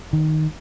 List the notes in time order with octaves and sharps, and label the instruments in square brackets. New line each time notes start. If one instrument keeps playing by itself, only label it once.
[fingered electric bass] D#3